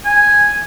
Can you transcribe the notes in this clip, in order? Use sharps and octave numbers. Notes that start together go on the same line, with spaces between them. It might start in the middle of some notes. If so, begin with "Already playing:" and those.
G#5